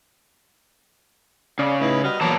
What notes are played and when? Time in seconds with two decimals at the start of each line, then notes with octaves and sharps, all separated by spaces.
1.59 C#3 C#4 D5
1.81 A2 D#4 E4 B4
2.04 G3 F#4 B4 D#5 F6
2.21 A#2 E3 F#3 B3 C#5 A5 A#5 D6